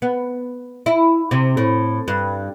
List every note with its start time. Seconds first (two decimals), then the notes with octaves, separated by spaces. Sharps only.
0.02 B3
0.86 E4
1.31 C3
1.57 A2
2.08 G2